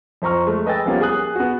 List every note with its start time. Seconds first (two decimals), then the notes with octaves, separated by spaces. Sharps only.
0.22 F2 C5 A#5 C#6 F6
0.46 G#3 A3
0.66 B4 D#5 G5 G#5 E6 A6
0.86 F3 G3 A#3 B3 C#4 G4
1.00 G#4 G#5 D#6 F#6
1.35 B3 F#4